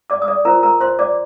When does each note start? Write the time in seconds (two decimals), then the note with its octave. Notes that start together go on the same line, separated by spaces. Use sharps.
0.10 D5 D6
0.22 D#6
0.28 D5 D6
0.45 F4 A#4 C5 A#5
0.63 A#4 A#5
0.81 C5 C6
0.99 D5 D6